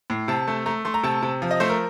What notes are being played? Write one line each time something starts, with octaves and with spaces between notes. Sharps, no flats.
A2
C3 A5
A3
A3 A#5
A3 C6
A#5
C3 A5
C3
F3
D#5
A3 C5
A#4